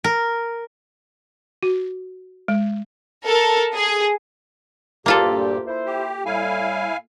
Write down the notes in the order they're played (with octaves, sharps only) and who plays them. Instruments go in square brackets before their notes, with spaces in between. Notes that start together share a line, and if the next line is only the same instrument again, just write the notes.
[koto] A#4
[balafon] F#4
G#3
[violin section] A4 A#4
G#4
[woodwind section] D2 G4 [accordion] G2 A#2 [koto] A#3 F4 A4
[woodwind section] E4 C5
[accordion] G4
[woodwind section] A2 G3 [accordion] E4 F5 G#5